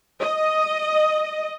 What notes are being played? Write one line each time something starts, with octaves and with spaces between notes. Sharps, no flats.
D#5